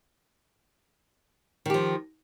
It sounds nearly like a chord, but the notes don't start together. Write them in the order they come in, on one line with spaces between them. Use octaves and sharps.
D#3 G4 F3